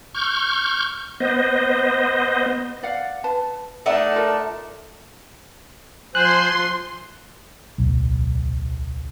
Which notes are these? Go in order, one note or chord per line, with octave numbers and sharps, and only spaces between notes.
C#6 F6 G6
B3 C5 D#5
D5 F5 F#5
B4 A5
A3 D4 D#4 A4 F#5
F4 A4 A#4
F3 C5 G#5 C6 F#6
D1 B1